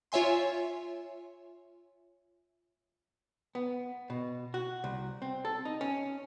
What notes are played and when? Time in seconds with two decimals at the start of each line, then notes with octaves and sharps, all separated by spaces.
0.12 F4 C#5 E5 G#5 C6
3.55 B3
4.10 B2
4.54 F#4
4.84 C2
5.22 C4
5.45 A4
5.65 D#4
5.81 C#4